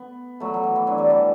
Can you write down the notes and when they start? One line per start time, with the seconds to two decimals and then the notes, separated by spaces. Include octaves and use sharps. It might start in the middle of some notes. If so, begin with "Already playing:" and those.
Already playing: B3
0.40 F#3 A3
0.54 F#3
0.64 E3
0.76 E3
0.87 D3 F#3
0.98 E3 G3
1.10 E3 G3